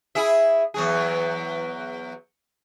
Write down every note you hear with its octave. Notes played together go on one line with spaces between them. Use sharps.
E4 G#4 E5
E2 F#3 G#4